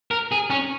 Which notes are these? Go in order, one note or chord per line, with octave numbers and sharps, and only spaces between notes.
A#4
G#4
C#4